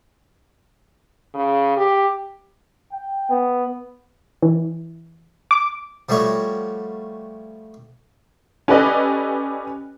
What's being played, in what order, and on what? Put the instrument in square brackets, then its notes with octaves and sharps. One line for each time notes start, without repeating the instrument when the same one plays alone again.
[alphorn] C#3
G4
[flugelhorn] G5
B3
[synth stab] E3
D6
[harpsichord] F3 G3 A3 F#4 C#5
[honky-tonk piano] C#4 G4 A4 B4 D5 D#5